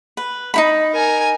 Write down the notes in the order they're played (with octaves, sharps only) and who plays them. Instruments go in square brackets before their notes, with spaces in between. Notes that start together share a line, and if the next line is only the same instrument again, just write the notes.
[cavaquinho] B4
D#4 E4 B5
[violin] A#4 G#5